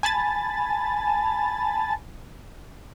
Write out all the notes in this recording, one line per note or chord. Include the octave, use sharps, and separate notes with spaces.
G#5 A5 B5 A6